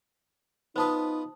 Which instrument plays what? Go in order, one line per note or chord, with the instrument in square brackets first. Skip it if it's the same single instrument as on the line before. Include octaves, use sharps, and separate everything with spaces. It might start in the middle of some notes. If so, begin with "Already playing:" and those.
[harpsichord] B3 F4 B4 [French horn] D#4 [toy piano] C5 A5 D#6